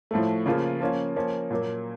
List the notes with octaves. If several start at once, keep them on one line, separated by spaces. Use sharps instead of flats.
A2 F3 A3
C#3 F3 A#3 F4
F3 A#3 C#4 F4
F3 A#3 C#4
A#2 F#3 A#3